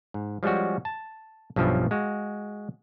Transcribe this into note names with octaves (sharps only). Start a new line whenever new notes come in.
G#2
F3 G3 G#3 C#4 F#4
A5
B1 G2 B2 F3 C#4 E5
G#3 F#4 F5